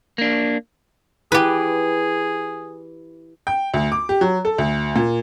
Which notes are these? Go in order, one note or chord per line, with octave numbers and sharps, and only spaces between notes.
A#3 D4
E3 G4 G#4 B4
G5
D2
D6
G4
F#3
A4
D2
A#2